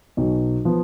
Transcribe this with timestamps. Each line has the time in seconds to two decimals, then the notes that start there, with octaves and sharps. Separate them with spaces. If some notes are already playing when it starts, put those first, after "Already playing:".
0.17 B1 B2 F#3
0.65 F3 B3